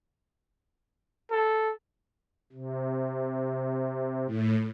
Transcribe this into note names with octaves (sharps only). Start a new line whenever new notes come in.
A4
C3
A2